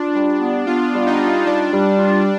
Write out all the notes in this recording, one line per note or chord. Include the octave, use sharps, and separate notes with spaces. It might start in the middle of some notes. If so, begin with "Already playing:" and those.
Already playing: D4 F4
G3
B3
B3 F4
G3
D#4
F4
G3 D4
G3
F4